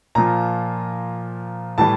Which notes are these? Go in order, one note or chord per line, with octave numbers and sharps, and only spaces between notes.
A#2 F3 A#5
A2 E3 G3 A5